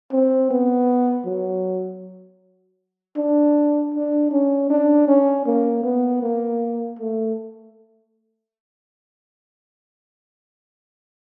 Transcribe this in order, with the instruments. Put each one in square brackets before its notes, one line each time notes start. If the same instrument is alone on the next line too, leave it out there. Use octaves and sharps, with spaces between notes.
[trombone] C4
B3
F#3
D4
D4
C#4
D4
C#4
A#3
B3
A#3
A3